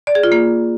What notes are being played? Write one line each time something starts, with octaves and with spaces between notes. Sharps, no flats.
D5
G#4
F4
A#3